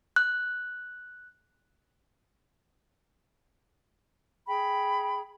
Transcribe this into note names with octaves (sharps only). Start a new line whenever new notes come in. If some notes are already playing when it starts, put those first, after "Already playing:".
F#6
G#4 G5 B5